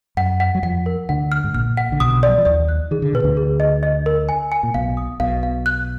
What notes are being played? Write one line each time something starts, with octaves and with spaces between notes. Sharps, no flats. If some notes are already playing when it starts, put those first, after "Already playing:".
F#2 F#5
F#5
F#3
F2 F3 F#5
A#4
D2 D3 F#5
F6
G#2
A#1 A#2 F6
F#5
D3
B1 B2 D#6
D5
F#3
F3
D#2 D#3 D5
F#6
D#3 G#4
D3
B2 B4
D2 D3
G#4
D#5
D#5
A#4
G#5
G#5
A#2
B1 B2 F5
D#6
B1 B2 F5
F5
F#6